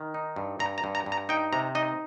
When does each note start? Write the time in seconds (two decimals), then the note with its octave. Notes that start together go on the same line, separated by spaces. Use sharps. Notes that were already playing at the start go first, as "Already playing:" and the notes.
Already playing: D#3
0.14 D#4
0.36 G2
0.59 G2 A#5
0.78 A#5
0.84 G2
0.95 A#5
1.06 G2
1.12 A#5
1.29 D#4 G5
1.53 C3 A#5
1.75 D#4 D#5